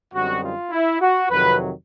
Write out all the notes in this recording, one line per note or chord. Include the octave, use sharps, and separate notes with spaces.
F#2 D3 G3 C4 D#4 F#4
F4
E4
F#4
F2 C3 D#3 F#3 B4